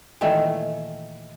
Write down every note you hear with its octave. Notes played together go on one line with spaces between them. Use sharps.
A#2 D#3 E3 A3